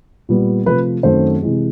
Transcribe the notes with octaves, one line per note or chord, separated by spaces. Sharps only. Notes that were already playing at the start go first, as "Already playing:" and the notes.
A#2 G3 B3
C3 F3 A3 B4
F#2 D#3 F#3 A3 C4 C5
C3 E3 G#3